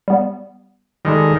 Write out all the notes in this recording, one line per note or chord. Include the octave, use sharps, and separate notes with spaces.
G3 B3
D#3 G3 G#3 A4